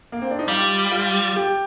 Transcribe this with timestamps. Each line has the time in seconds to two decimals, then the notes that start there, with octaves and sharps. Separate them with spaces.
0.12 A#3
0.22 C4
0.30 D4
0.39 D#4
0.48 G3 F4
0.91 F4
1.36 G4